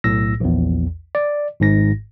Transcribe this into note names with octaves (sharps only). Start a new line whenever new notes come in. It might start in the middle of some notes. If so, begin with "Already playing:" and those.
B1 A2 E6 A#6
A#1 E2
D5
G#1 G#2 A#6